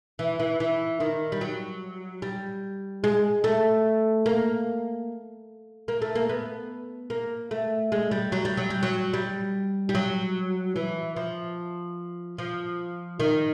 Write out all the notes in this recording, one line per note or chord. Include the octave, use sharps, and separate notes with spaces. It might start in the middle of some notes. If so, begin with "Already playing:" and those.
E3
E3
E3
D#3
G3
F#3
G3
G#3
A3
A#3
A#3
A3
A#3
B3
A#3
A3
G#3
G3
F#3
G3
F#3
G3
F#3
G3
G3
F#3
E3
F3
F3
D#3